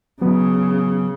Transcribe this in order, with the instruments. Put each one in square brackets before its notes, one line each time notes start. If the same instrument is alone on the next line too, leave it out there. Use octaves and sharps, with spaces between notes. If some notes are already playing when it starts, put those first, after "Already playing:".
[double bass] C#3 [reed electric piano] F#3 B3